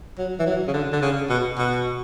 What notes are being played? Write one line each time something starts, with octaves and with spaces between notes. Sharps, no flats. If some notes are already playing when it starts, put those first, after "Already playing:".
F#3
E3
F#3
C#3
D3
D3
C#3
B2
B2